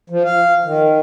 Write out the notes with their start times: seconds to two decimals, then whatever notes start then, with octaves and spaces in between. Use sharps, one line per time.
0.10 F3
0.24 F5
0.65 D#3